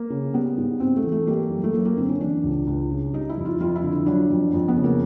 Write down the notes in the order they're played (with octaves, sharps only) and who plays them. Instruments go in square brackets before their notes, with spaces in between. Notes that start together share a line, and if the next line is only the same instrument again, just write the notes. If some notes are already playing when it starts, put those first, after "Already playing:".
Already playing: [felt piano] A#3
C#3
G3 B3
G#2
G#2 C4
A3
E3
A3
G3 A#3
F#2
A3
F#2 A#3
A#3
D3 C4
C#4
E3 D4
C#2
C#2
C#3
G3 D#4
E4
F2
F4
F2 F4
E4
D3
F#3 D4
F2
F2
B3
C#3
A#3